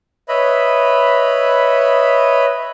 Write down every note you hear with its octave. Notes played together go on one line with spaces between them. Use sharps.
B4 C#5 D#5 E5 B5